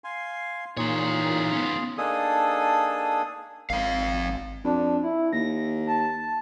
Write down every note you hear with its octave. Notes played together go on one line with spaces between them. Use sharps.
F5 G#5 C6
A#2 E3 D#4 F4 G#4 C#5
B3 C#4
A#3 D4 D#4 G#4 A4 D#6
G#1 C4 F5
F2 D4
E4
D#2 A#6
A5